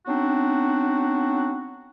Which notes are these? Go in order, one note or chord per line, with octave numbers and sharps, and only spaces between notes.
F#3 B3 C4 D4 D#4 F#4